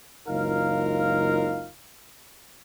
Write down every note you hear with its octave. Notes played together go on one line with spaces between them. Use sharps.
F#1 C#2 D#4 F4 A#4 F5